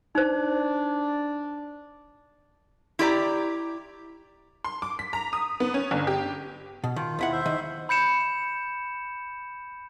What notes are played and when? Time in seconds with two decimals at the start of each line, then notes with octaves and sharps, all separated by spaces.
0.15 D4 D#4 C5
2.99 E4 G4 D5 A#5
4.65 C6
4.82 D6
4.99 B6
5.13 A#5
5.33 D#6
5.60 B3
5.74 C#4
5.91 G1
6.07 G4
6.84 B2
6.96 D#3 F4
7.19 D#2 E4 F#5
7.32 C5 E5
7.46 D#3
7.89 B5 G6 C#7 E7